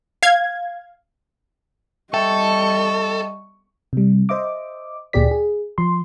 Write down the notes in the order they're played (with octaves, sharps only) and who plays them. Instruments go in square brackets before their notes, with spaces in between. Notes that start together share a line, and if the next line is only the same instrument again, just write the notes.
[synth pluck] F5 G#6
[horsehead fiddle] G3 D#5 [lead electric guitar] A4 [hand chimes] E5 G5 A5 [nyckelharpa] C#6
[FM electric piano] C3 G3
C5 D#5 E5 D6
D2 A#2 G4 G#4 D5 B6
G#4
F3 C6